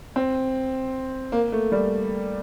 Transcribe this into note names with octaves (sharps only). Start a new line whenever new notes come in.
C4
A#3
A3
G3